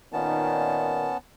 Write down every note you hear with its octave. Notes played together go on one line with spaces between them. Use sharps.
A#2 D#3 B3 C#4 A5